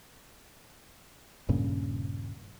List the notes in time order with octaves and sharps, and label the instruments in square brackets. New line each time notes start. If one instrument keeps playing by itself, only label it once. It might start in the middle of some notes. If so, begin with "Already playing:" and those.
[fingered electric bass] D#1 G2 A#2 C#3